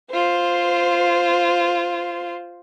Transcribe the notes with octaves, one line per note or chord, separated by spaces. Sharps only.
F4 C5